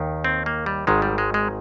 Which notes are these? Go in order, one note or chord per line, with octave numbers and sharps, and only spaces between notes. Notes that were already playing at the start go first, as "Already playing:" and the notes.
Already playing: D#2 D#3
C4
A#3
G3
G#1 G#2 D#3 G#3
G3
G#3
G#3